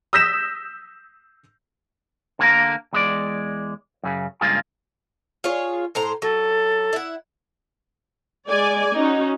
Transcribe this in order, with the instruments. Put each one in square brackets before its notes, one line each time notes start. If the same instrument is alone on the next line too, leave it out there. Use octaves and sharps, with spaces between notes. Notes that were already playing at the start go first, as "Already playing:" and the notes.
[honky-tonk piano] D#6 E6 G6 A#6 B6 E7
[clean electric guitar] D3 A#3 A4 A#4
E2 G#3 D5
F#2 C#3
C#2 G2 A#3 F4 G#4
[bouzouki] F4 G#4 C#5
A2 C5 A#5
[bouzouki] F#3 [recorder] A4
[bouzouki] E4 F#5
[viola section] G#3 D5 G#5
C#4 D#4 F#4